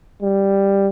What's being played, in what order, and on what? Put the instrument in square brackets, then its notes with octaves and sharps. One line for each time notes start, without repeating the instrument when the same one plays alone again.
[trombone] G3